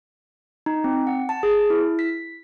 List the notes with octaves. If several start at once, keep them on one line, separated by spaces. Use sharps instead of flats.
D#4
C4
F#5
A5
G#4
E4
B6